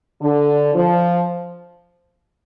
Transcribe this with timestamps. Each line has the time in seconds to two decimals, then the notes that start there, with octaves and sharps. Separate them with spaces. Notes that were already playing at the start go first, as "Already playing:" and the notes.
0.22 D3
0.74 F3